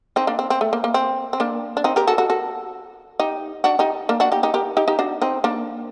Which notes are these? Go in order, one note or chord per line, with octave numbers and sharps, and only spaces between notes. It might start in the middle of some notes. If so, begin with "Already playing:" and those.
C4 D#4
A#3 D4
C4
C4
A3
A#3
A#3
C4
C4
A#3 D4
D4
C4 D#4
G4 A#4
F#4 A4
F#4 A4
F#4 A4
D#4 G4
D4 F#4
D#4 G4
A#3 D4
D4 F#4
D#4 G4
D#4 G4
G4 A#4
D#4 G4
D#4 G4
D4 F#4
C4 D#4
A#3 D4